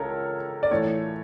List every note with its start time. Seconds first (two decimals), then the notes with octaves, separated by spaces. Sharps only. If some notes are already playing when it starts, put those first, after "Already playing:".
Already playing: C#2 C#3 A4 A#4 C#5
0.63 D5
0.70 A2 E3 A3 C#5